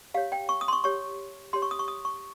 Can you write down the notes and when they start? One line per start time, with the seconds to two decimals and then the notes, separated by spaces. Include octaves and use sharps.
0.14 G4 F5
0.17 C#5
0.32 G5
0.49 C#6
0.61 D#6
0.68 C6
0.73 C#6
0.84 G4 C#5 C#6
1.53 G4 C#5 C6
1.62 C#6
1.71 D#6
1.79 C#6
1.88 D#6
2.05 C#6